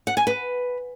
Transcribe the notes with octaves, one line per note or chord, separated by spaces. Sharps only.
F#5
G#5
B4